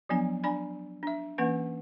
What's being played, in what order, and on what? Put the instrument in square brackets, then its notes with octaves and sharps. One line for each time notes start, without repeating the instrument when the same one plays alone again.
[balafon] F3 F#3 B3 D4 G#5
D4 D5 G#5 B5
D4 E5
E3 A#3 C#4 B4 F#5